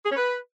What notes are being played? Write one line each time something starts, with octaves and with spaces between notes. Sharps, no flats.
G#4
C#4
B4